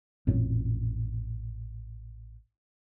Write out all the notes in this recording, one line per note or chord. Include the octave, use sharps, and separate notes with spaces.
A1 F2 A#2 F#3